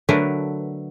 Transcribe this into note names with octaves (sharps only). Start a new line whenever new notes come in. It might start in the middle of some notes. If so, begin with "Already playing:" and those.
D3 F#3 A3 D4 A#4 B4